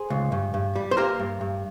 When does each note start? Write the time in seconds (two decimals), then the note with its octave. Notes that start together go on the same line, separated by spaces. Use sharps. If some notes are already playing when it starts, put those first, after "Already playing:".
Already playing: G#4 C5
0.10 C#2
0.32 G2
0.54 G2
0.76 G3
0.91 C5
0.97 A#3 G4 A#4
1.19 G2
1.41 G2